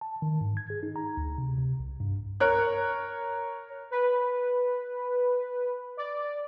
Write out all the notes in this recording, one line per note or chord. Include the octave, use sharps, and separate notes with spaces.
A5
D#3
G#2
G#6
G#4
D#4
A#5
D2
C3
C3
C2
G2
A#4 C#5 F#6
B4
D5